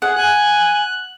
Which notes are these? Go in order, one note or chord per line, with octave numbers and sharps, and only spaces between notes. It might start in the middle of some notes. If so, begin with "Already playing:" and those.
G#4 F#5
G#5 F#6